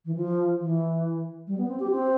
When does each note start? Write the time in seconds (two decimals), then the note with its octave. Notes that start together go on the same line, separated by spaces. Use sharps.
0.05 E3
0.15 F3
0.59 E3
1.47 G3
1.58 B3
1.68 C4
1.80 G4
1.91 C4